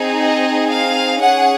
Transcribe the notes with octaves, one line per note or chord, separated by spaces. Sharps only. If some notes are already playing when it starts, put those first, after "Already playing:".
Already playing: C4 D#4 G#4
D#5
F5
C#4 G#4 F#5